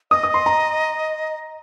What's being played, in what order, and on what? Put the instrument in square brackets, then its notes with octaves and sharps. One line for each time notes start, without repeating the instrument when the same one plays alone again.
[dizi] D#5 [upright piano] D#6
[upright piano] D#6
C6
A#5